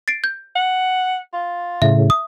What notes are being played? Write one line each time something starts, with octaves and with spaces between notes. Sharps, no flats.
A6 C7 D7
G6
F#5
F4
A2 C#3 E5
D#6